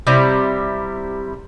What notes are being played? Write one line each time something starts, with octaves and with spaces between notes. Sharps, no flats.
C3 G3 E4